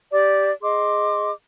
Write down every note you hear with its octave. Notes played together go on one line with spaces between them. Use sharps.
G4 D5 D6
G#4 D#5 C6 D6